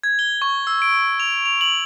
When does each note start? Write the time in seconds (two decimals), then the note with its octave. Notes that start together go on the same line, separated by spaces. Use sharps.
0.04 G#6
0.19 G7
0.42 C#6
0.67 E6
0.82 D7
1.20 F7
1.45 F7
1.61 F#7